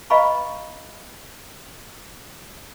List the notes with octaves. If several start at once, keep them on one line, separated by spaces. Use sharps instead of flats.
B4 D#5 F5 A#5 B5 C#6